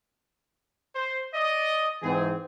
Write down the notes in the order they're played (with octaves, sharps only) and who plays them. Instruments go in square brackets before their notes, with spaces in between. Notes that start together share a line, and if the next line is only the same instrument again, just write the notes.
[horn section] C5
D5 D#5
[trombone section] G#2 E3 C4 [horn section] G#4